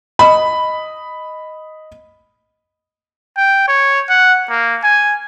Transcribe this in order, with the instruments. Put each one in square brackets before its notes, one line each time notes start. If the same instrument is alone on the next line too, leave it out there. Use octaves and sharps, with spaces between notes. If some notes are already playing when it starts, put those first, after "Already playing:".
[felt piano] D#5 B5
[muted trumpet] G5
C#5
F#5
A#3
G#5